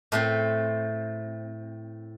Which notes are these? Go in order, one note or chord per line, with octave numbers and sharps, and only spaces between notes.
A2 A3 C4